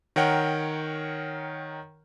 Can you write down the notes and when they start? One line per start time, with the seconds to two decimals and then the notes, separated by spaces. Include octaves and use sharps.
0.16 D#3 A#4 C#5 F#5 G5